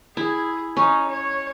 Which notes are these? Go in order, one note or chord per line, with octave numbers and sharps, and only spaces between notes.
E4 G#4
C#4 D#4
C#5